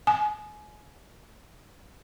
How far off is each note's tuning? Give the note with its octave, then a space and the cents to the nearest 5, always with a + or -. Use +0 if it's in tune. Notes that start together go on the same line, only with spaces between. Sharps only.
G#5 +25